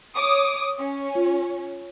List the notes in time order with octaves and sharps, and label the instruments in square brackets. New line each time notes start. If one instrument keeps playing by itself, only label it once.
[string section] C#5 D6 D#6
C#4
[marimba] F4